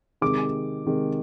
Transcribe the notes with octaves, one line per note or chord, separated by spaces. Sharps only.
C3 D#3 G#3 D6
C3 D#3 G#3